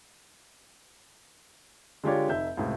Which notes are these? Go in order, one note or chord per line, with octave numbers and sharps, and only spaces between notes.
D3 G#3 F4 G4 C#5 D5
F1 D#4 E5 G6
C#2 A2 C3